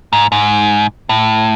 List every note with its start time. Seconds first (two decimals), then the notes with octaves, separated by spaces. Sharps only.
0.13 G#2
0.32 G#2
1.09 A2